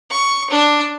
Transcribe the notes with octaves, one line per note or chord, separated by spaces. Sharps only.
C#6
D4